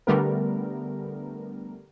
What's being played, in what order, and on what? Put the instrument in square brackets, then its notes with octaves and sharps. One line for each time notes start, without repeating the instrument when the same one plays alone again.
[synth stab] D3 G3 A3 B3 A#4